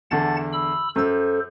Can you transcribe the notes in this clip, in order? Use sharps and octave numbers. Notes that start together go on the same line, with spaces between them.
E2 D3 F#5 A5 A6
B5 E6
F#2 A4 C5 E6